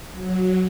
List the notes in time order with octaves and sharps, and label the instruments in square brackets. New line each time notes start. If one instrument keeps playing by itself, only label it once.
[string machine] F#3